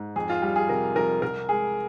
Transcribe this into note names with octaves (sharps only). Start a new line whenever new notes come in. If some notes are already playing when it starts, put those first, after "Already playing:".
Already playing: G#2
F2 G#4
F4
G3
G#4
C3 A#4
F2 A#4
C2 A#4
G#3 G#4